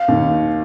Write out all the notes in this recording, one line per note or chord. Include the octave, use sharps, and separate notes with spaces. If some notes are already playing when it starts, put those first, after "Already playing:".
Already playing: F5
D#2 D#3